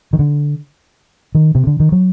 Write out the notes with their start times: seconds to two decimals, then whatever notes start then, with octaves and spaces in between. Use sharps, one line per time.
0.13 D#3
0.19 D3
1.35 D#3
1.55 C3
1.67 D3
1.80 D#3
1.92 F#3